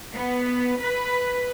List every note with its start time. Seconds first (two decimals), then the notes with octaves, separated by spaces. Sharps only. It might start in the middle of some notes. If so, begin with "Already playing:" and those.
0.14 B3
0.81 B4